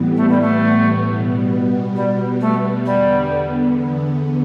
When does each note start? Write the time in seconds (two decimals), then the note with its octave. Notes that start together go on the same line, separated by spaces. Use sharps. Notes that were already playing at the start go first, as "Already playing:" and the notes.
Already playing: A2 E3 G3 B3
0.16 A3
0.29 G3
0.41 A3
1.07 B2 G3 B3
1.95 G3
2.40 A3
2.85 E2 D3 G3 B3